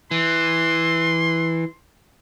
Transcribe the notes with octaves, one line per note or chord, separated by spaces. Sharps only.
E3 C6